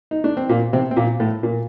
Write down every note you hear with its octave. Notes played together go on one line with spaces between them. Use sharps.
D#4
D4
C4
A#2 A#3
C3 C4
C4
A#2 A#3
A2 A3
A#2 A#3